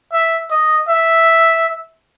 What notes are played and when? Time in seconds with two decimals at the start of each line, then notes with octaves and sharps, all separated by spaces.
0.13 E5
0.51 D#5
0.89 E5